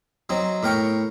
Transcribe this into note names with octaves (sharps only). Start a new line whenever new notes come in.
F#3 C4 D#4
A2 A#4 G5 C#6